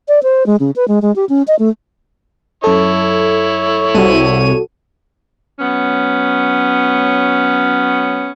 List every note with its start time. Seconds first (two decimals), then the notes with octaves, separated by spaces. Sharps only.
0.08 D5
0.23 C5
0.46 G#3
0.60 C#3
0.76 B4
0.88 G#3
1.02 G#3
1.16 G4
1.29 C#4
1.48 D#5
1.59 A3
2.64 F#2 E4 A4 C#5
3.94 C2 F#4 A4 D#7
5.59 F#3 B3 C#4